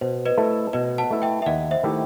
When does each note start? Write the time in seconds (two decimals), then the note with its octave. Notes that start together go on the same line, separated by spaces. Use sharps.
0.01 B2 C5
0.25 B4 D#5
0.38 A3 E4 A4
0.73 B2 B4 D#5
0.98 F#5 A5
1.10 A3 E4 A4
1.22 E5 G5
1.42 E5
1.46 D#2 D#5 F#5
1.71 C5 E5
1.83 D#3 A3 E4 G4